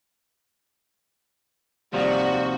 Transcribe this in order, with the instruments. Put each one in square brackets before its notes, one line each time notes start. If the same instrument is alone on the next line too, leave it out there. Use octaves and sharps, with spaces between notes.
[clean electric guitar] D#2 C3 F3 [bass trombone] G3 [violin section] F#4 [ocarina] D5